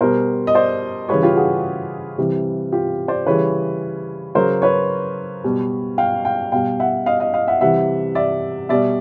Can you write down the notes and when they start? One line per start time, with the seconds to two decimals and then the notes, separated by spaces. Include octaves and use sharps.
0.01 B2 G3 A#4 C5
0.47 D#5
0.55 C5 D5
1.09 C#3 E3 G3 B4 C#5
1.23 F4 G4
1.37 F#4 G#4
2.18 C3 E3 G3
2.72 F4 G4
3.08 C5 D5
3.27 C#3 E3 G3 B4 C#5
4.35 C#3 F#3 A#4 C5
4.62 B4 C#5
5.44 B2 G3
5.98 F5 G5
6.25 F5 G5
6.52 B2 G3 F5 G5
6.80 E5 F#5
7.06 D#5 F5
7.20 D#5 F5
7.34 D#5 F5
7.48 E5 F#5
7.61 C3 E3 G3 E5 F#5
8.15 D5 E5
8.69 B2 G3 D5 E5